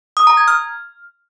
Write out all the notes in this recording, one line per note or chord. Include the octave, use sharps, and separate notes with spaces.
D#6
A#5
G#6
F6